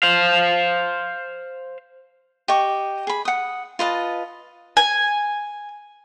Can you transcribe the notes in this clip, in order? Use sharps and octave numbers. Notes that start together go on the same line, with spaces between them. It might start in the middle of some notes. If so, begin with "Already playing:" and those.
C5 F5
G4 D#5 C#6
G#4 B5
F#5 D#6
F4 B4 D#5 A5
G#5